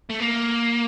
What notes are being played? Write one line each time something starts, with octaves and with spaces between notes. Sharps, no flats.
A3
A#3